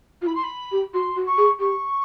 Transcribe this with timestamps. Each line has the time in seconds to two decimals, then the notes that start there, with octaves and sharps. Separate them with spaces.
0.22 F4
0.27 E4 B5
0.35 C6
0.43 B5
0.72 G4
0.93 F#4 C6
1.16 F#4
1.26 C#6
1.38 G#4
1.60 G4 C#6